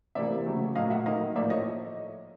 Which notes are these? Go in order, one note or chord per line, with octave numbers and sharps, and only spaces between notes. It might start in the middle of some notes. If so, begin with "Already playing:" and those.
C3 E3 G3 A#3 D5 E5
C#3 F#3 A3
A#2 F#3 A3 D#5 F5
E5 F#5
D#3 F#3 A#3 D#5 F5
A2 F3 A#3 D5 E5
C#5 D#5